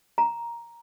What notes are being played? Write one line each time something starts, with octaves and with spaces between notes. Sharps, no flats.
A#5